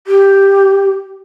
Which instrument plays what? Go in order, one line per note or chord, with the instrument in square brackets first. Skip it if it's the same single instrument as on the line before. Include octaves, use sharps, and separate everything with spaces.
[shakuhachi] G4